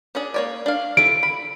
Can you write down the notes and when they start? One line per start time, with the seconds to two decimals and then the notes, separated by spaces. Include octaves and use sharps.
0.15 C#4 D4 G#4
0.34 A#3 C#5 D5
0.66 D4 F5
0.97 E4 F4 A4 D7
1.23 B5